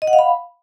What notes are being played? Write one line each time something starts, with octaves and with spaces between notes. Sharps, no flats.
D#5
F#5
F5
B5